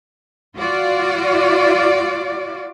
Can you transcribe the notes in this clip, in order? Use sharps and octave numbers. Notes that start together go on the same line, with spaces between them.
F4 F#4 D5